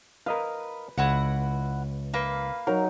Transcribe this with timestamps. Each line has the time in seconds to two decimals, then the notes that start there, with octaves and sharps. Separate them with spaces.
0.26 A#4 B4 D#5 F5
0.98 C#2 E4 F#4 F#5
2.14 A#3 B4 F5
2.67 F#3 D#4 A#4